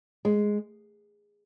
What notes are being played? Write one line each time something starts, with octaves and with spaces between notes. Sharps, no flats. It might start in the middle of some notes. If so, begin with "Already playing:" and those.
G#3